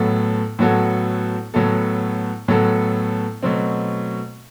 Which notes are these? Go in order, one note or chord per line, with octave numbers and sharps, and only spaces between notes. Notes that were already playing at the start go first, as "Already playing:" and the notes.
Already playing: A2 F#3 B3 F#4 A4
A2 F#3 B3 F#4 A4
A2 F#3 B3 F#4 A4
A2 F#3 B3 F#4 A4
B2 F#3 A3 C4